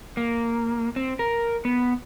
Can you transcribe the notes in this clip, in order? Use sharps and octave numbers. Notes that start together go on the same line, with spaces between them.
A#3
C4
A#4
B3